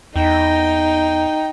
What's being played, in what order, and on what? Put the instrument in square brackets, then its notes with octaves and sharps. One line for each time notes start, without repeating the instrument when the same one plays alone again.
[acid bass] E2 [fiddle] D#4 [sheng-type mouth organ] G5